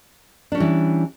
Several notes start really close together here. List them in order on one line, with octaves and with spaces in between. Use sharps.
D4 C#4 G3 E3